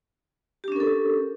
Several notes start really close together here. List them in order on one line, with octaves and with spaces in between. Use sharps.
G4 D4 C#4 A#4 A4